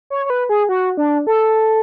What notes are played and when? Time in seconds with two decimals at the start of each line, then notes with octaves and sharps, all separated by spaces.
0.10 C#5
0.26 C#5
0.30 B4
0.49 G#4
0.69 F#4
0.97 D4
1.27 A4